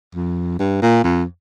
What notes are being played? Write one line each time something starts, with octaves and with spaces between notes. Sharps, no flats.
F2
G2
A#2
F2